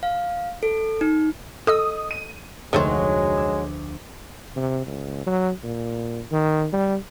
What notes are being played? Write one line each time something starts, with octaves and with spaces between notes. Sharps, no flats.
F5
A4
D#4
A4 D#5 D#6 E6
D#7
F1 D2 D#3 F#3 G#3 A3 C5 C#6
D6 E6 G#6
C3
C#2
F#3
A#2
D#3
G3